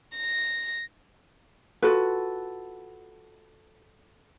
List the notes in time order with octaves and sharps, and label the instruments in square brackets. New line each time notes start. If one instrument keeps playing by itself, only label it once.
[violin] A#6
[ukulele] F4 F#4 A4 B4